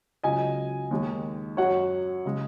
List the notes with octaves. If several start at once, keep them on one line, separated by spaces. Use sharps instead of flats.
C#2 C#3 F#3 D#5 G#5
D#2 D#3 G#3
F#2 F#3 C#5 F#5
C#3 G#3